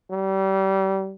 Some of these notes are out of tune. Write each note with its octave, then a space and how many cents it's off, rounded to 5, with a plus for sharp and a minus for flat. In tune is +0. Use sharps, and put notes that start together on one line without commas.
G3 -30